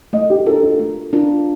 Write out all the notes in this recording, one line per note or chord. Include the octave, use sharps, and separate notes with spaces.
A3 D#5
G4
D4 F4 A4 A#4
A4
A3
D4 F4 A#4